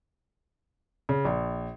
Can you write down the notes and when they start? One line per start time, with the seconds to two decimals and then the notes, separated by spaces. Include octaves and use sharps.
1.09 C#3
1.25 A#1